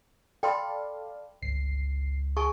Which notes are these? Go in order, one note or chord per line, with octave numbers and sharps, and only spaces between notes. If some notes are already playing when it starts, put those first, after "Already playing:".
A4 D5 F5 G5 B5 C6
G1 C#2 C7
G#4 G#5 A5 C#6